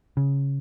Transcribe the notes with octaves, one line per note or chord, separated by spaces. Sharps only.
C#3